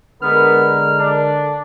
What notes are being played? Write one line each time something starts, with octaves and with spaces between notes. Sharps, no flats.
D3 G#3 B3 A#4 F6
D4